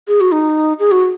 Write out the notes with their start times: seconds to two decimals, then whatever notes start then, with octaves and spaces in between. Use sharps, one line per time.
0.08 G#4
0.21 F#4
0.32 D#4
0.79 G#4
0.91 F#4